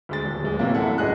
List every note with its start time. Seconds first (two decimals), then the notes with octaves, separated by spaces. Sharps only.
0.09 D2 G#3 A6
0.24 D#1
0.43 D1 G#3
0.59 A2 C3 E3 F#3 A#3
0.74 F#2 E4 A4 F#5
0.98 D1 G1 G#4 D#5 F#5 F#6